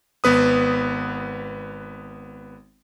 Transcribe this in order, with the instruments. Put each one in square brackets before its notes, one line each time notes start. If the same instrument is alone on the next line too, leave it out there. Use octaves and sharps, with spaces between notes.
[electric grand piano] G#1 B3 B4 D#6